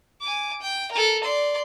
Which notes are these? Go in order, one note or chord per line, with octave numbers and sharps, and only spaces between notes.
G#5 D6
G5
A4 A#4
D5 C6